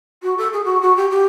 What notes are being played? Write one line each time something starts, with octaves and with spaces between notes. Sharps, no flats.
F#4
A4
G#4
F#4
F#4
G4
G4